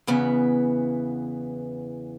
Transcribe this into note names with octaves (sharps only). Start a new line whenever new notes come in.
E2 C#3 E3 B3